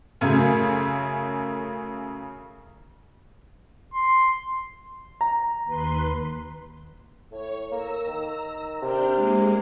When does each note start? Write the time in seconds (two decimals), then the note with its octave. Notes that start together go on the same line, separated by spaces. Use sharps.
0.21 F#2 C#3 A3
3.94 C6
5.21 A#5
5.64 D#2 B4 C6
7.31 A2 C#5
7.71 A#3 A#5 E6
8.07 D#3
8.82 C3 D4 F6 G6
9.14 G#3 A#3